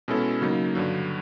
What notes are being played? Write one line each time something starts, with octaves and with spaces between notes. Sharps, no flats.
B2 G#3 C#4 E4 A4
C#3 F#3 A#3 D#4
G2 D3 F#3